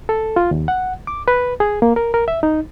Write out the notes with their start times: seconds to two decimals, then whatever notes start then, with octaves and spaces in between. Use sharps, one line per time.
0.09 A4
0.36 F4
0.51 D#2
0.68 F#5
1.07 D6
1.28 B4
1.60 G#4
1.82 A#3
1.96 A#4
2.14 A#4
2.28 E5
2.43 D#4